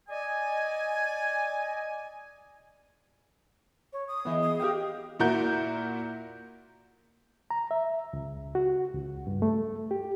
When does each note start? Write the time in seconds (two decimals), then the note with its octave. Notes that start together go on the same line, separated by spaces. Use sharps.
0.09 D5 D#5 G#5
3.93 C#5
4.08 D#6
4.25 E3 G#3 B3 F4 D#5
4.42 D#6
4.60 E2 D#4 G4 A#4 F5 G5 D#6
5.20 A#2 E4 F#4 A#4 G6
7.51 A#5
7.71 E5
8.13 C#2
8.55 F#4
8.94 C#2
9.27 G2
9.42 A3
9.91 G4